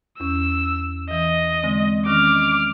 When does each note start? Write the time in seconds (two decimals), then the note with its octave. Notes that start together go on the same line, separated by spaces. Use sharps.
0.20 E2 C#4 E6
1.11 E3 D#5
1.63 D3 G#3 C4
2.06 D#3 C#4 D6 F6